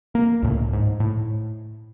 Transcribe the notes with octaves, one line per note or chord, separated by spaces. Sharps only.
A#3
C#2 A2
G#2
A2